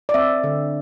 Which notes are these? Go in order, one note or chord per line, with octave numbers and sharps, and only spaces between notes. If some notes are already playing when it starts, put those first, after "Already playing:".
D5
C4 E5
D3